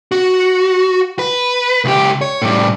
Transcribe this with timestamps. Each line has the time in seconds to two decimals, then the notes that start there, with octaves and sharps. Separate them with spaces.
0.12 F#4
1.19 B4
1.85 C#2 G4
2.21 C#5
2.42 A2 G3